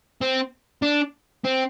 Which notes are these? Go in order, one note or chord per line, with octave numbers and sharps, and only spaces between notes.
C4
D4
C4